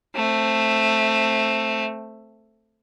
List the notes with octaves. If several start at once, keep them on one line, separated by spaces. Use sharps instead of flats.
A3 C4